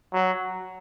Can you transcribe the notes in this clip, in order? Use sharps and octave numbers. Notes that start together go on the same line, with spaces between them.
F#3